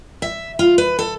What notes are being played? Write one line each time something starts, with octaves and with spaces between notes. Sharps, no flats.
E5
F4
B4
A4